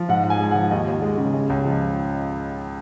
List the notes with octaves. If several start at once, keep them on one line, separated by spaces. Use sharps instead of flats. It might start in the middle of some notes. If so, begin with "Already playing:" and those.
Already playing: F3
G#2 F#5
G#2
G#5
G#3 G#5
F#5
F3
D#2 D#5
D#2
G#3
C#3
G#3
C#2
F3